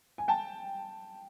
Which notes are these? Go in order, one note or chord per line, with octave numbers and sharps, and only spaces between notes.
G#5
G5 A5